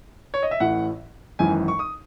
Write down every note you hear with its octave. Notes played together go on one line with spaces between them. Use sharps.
C#5
D#5
E5
A1 A2 E3 F#5
G#1 F#2 E3 G#5
C#6
D#6